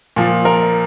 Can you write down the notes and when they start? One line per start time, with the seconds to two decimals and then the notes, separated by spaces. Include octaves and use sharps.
0.16 A#2 F3
0.45 A#4